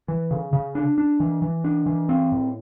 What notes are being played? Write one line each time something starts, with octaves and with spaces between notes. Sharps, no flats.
E3
C#3
C#3
D4
D4
E3
E3
D4
E3
C4
A2